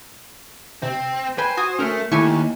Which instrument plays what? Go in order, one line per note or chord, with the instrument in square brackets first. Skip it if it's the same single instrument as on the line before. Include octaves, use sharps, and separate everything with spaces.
[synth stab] C3 [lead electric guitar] C4
[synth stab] B4 G5 G#5 [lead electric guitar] C5
[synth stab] F#4 G#5 D#6
[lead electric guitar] A3 [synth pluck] C#4 A#4
[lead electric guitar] D#2 [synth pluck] A3 E4 G4 [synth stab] G#5 C#6